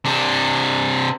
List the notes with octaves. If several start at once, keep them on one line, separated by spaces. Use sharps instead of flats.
C3 D4